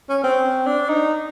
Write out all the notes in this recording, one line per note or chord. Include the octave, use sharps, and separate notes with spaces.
C#4
C4
D4
D#4